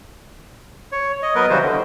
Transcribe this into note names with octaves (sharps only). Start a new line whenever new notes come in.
C#5
D#5
F#3 B3 A#4 B4 D#5
C#3 E3 G3 F#4 C5
D3